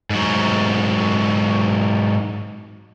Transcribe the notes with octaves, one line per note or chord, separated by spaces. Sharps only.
G#2 F#3